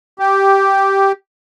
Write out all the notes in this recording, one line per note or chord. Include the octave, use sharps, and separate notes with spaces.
G4